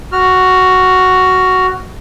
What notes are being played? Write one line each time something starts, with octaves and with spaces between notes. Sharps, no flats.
F#4 F6